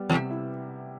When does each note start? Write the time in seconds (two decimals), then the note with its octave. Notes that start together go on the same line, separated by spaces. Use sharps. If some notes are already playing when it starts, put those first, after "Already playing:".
Already playing: G3 B3
0.10 E2 C3
0.30 E4